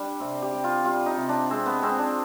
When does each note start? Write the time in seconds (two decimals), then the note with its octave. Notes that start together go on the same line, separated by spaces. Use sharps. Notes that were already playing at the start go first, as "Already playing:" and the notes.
Already playing: G3 D4
0.20 C3 C4
0.42 G4
0.52 G3
0.64 F4
0.85 G3 F4
1.06 D#4
1.17 C3
1.29 D4
1.50 G#3 C4
1.66 B3
1.82 G#3 C4
1.99 D4